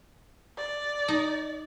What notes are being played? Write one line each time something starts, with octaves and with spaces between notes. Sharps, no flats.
D5
D#4